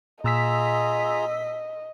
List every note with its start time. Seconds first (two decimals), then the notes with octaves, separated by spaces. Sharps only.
0.24 A#2 F4 G#4 D#5 A#5 E6 B6